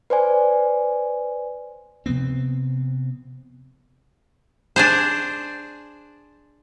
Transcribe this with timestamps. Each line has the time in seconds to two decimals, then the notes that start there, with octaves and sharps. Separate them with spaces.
0.10 B4 C5 D5 G#5
2.06 C3 F3 B3 C4
4.76 D4 G#4 C5